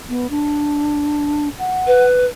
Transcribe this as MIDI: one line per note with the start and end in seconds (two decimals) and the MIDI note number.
0.09 0.27 59
0.30 1.49 62
1.59 2.05 78
1.87 2.26 71